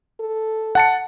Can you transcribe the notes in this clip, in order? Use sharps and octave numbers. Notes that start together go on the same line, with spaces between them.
A4
F#5 A5 C#7